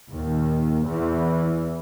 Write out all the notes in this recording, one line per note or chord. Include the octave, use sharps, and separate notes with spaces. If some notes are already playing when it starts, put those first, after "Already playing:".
D#2 A#2 D#3
E2 E3